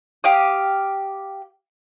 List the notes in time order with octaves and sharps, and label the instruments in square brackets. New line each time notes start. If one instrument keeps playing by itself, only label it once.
[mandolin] G4 F5 D#6